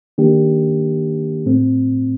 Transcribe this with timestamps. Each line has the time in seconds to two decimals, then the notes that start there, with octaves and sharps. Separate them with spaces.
0.18 D#3 A#3 D4 G4
1.46 A2 A3 C4